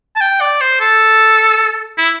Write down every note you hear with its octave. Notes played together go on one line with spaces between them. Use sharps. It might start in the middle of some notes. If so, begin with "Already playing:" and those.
A5
G5
D5
C5
A4
E4